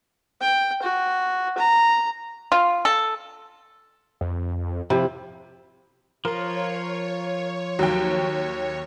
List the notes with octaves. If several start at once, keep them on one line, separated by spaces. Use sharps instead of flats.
G5
F#4
A#5
F4
A4
F2
C3 F3 E4
F3 F4 A#4 C#5
D#2 F#3 G5